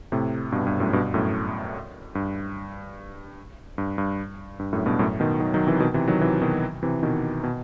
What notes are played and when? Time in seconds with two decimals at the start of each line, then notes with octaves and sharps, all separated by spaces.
0.12 A2 C3
0.52 G2 B2
0.67 G2
0.80 F#2 A2
0.93 G2 B2
1.14 F#2 A2
2.15 G2
3.78 G2
3.98 G2
4.59 G2
4.73 F#2 A2
4.86 G2 B2
4.99 F#2 A2
5.20 B2 D#3
5.40 D#3 F#3
5.54 D#3 F#3
5.67 C3 E3
5.80 B2 D#3
5.94 C3 E3
6.08 D#3 F#3
6.21 C3 E3
6.41 B2 D#3
6.83 C3 E3
7.03 B2 D#3
7.44 B2